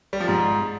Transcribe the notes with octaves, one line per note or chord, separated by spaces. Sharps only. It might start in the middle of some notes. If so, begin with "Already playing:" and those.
G3
F3
G#2